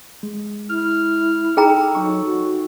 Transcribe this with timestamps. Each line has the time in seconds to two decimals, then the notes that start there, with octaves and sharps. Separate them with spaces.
0.23 G#3
0.70 E4 F6
1.57 D#4 G#4 A4 G5 A#5
1.95 F#3 D#4 C#6
2.25 F#4